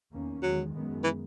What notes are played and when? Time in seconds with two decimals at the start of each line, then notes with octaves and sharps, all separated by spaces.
0.11 E2 D#3 A#3 C#4
0.42 E2 D#3 F#3 G#3
0.74 F#2 D#3 G#3 B3
1.04 E3